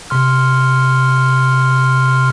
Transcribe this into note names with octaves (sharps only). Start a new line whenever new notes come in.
C3 C6 F6